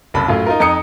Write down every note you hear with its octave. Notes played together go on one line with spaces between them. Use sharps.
F#1 C2 A5 B5
F#2 A2 F4
D#4 F4 A#4
F2 D#4 A#5 D#6 C#7